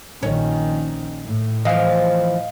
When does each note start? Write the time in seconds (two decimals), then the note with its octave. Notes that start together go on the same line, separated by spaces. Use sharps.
0.23 A#1 D#3 C#4
1.26 A2
1.65 E3 F3 D#5 F5